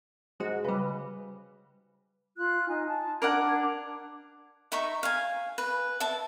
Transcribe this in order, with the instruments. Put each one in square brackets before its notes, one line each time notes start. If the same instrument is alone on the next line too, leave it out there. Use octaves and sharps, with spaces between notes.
[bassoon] G#2 [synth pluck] G#3 F#4
[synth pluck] C#3 G3 [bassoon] B4
[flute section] F4 F#6
D#4 G#5
A5
[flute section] D4 G#6 [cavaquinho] A#4 D5 F#5
[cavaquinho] D#4 E5 A#5 C#6
F5 G#5
B4
E5 A5